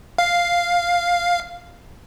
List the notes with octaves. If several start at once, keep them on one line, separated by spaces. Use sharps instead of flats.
F5